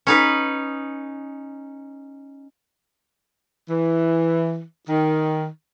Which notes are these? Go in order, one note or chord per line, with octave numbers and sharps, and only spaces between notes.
C#4 D#4 B4
E3
D#3